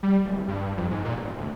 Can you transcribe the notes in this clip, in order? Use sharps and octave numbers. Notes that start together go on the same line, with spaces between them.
G3
D1
G2
F2
G#2
A#2
E1
D2